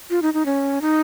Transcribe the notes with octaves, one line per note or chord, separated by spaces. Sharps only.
F4
D#4
D#4
C#4
D#4